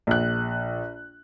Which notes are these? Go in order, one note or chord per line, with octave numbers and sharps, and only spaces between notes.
A#1 F#6